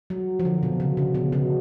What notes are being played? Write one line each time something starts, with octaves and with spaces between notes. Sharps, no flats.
F#3
F3
D3
B2
C#3
C#3
B2
C#3